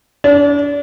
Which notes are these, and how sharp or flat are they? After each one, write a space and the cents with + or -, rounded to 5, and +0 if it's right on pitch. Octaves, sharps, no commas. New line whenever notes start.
D4 -35